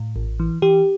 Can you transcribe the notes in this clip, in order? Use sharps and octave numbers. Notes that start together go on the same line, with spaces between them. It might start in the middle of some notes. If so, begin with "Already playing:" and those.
Already playing: A2
A1
E3
E3 G4